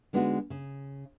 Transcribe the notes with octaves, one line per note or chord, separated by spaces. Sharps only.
D3 G#3 B3 D#4 E4 F#4
C#3